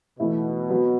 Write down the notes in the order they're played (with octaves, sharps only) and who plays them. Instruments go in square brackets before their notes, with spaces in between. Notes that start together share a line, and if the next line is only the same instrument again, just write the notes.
[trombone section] B2 [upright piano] E3 A3 E4
[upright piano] F#3 B3 F#4 B4